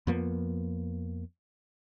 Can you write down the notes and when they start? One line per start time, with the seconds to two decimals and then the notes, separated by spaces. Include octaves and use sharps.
0.07 F2 F3 A#3 B3